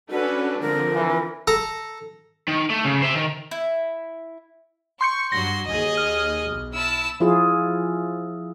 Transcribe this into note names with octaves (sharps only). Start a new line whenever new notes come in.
C#4 D4 F#4 A4 B4
D3 F3 C4 A#4
E3
A4 A#5
D#3
A3
C#3
C5 E5
D#3
E4
C6 C#6 G6 C#7
G2 F#3 F#4 C6 A#6
D#2 G#4 D#5
F6
B1
E4 A5 E6
F3 E4 F4 G#4